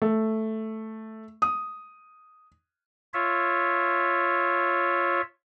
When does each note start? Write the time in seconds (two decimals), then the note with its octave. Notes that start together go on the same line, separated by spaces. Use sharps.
0.02 A3
1.42 D#6
3.14 F4 C#5 E5